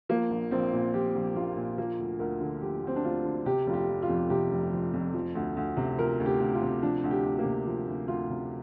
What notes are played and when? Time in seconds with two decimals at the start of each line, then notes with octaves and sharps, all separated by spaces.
0.09 F3 A#3
0.30 A#1
0.51 A#1 C4
0.73 A#2
0.94 F3 G4
1.15 A#1
1.36 A#1 F4
1.56 A#2
1.78 F3 A#3
1.99 D2
2.19 D2 A#4
2.40 D3
2.62 F3 G4
2.83 D2 C4
2.96 D4
3.04 D2 F4
3.25 D3
3.46 C3 G4
3.67 F1 F4
3.73 G4
3.88 F3
4.02 F4
4.09 F2
4.30 C3 G4
4.52 F1
4.72 F3
4.93 F2
5.14 F3
5.35 D2
5.57 D2
5.77 C3
5.98 F3 A#4
6.20 D2
6.26 G4
6.40 D2
6.54 F4
6.61 C3
6.82 F3 D4
7.04 D2
7.11 G4
7.24 D2
7.39 A#3
7.45 C3
7.66 F3
7.88 D2
8.08 D2 F4
8.30 C3